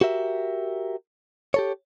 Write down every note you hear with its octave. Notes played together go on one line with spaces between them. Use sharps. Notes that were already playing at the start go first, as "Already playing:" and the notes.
F#4 G4 A#4 E5
G4 A4 C#5